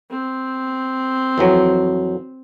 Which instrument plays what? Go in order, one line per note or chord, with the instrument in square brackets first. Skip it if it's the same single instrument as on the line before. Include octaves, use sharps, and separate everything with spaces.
[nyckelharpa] C4
[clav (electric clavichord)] F2 E3 F#3